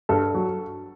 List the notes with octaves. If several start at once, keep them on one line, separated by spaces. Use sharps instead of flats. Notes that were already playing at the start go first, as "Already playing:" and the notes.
G2 A4
F#3